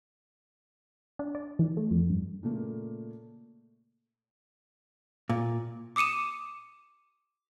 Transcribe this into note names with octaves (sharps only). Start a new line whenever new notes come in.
D4
D5
E3
A3
F2
G2
A#2 C#3 A3 A#3
A#2
D6 D#6 C#7 D#7 E7